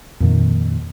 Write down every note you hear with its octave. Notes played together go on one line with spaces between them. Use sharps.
F2 A#2 D#3